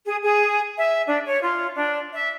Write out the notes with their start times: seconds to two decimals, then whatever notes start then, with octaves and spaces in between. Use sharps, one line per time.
0.06 G#4
0.23 G#4
0.77 E5
1.06 D4
1.26 C#5
1.42 F4
1.76 D4
2.13 E5